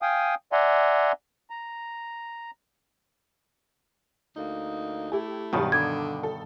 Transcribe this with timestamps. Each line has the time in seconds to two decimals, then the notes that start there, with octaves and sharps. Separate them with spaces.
0.02 F5 G5 G#5 D#6
0.52 D5 E5 F#5 G#5 A#5 C6
1.50 A#5
4.36 D2 A#3 D#4
5.12 A3 E4 G4
5.53 G2 B2 D#3 F#3 G3
5.72 D3 D6 G#6
6.23 A4